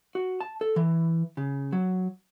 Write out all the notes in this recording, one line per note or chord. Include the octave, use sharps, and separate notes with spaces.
F#4
A5
A4
E3
C#3
F#3